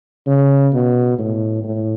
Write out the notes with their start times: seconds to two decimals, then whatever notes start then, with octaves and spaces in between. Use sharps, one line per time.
0.27 C#3
0.73 B2
1.19 A2
1.64 A2